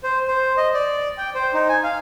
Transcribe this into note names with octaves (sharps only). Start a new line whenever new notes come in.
C5
C5
D#5
D5
G5
C5
D#4
G#5
F5